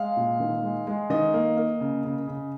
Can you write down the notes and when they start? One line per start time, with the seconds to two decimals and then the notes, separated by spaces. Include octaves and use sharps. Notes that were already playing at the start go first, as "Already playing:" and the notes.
Already playing: G#3 F5
0.17 A#2
0.40 D#3
0.63 G#3
0.87 G#3
1.10 D#3 D#5
1.34 A#3
1.57 A#3
1.80 C#3
2.04 C#3
2.28 C#3